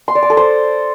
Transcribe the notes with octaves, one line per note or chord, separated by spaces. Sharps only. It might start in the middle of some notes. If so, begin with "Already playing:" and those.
C6
D5
D6
A4
C5